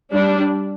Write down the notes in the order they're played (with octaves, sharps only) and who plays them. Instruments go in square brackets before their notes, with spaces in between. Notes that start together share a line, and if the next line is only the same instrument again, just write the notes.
[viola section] G3 D4